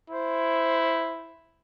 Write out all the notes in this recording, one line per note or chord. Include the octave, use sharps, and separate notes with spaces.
E4 C5